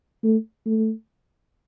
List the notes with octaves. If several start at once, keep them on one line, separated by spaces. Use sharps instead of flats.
A3
A3